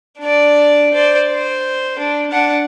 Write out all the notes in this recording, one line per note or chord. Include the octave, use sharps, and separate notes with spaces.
D4 D5
C5 D5
C5
D4
D4 F#5